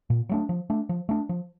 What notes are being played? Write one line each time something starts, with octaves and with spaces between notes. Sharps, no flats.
A#2
F#3 A3 D4
F3
A3 D4
F3
A3 D4
F3